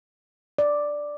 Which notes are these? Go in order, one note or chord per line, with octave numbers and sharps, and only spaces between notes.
D5